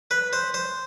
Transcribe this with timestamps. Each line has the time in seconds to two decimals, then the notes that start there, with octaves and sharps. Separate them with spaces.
0.11 B4
0.33 C5
0.54 C5